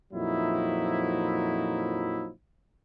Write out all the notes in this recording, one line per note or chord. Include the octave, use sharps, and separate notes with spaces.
F2 A#2 F3 F#3 D#4 E4